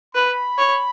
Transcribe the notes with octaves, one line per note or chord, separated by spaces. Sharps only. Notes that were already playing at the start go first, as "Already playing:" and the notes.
B4 B5
C#5